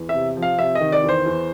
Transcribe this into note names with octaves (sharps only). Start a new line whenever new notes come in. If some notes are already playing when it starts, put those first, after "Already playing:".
Already playing: E2
E5
C3
F3
F5
C3 E5
D#5
D#3
D5
E2
C5
E2